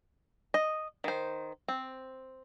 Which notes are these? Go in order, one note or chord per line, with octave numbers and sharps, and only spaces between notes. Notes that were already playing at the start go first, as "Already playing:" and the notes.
D#5
D#3 C5
C4